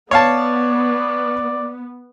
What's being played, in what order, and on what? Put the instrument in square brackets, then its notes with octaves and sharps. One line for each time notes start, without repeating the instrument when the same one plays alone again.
[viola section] B3 [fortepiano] C#5 F5 A5 [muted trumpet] D5